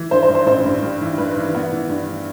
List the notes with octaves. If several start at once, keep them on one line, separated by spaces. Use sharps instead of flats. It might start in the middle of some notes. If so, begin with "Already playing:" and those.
Already playing: E3
G2 C5
C5
G2
C5
A1 C5
G2
G2
E3
G2 B4
E3
B3
E3
G2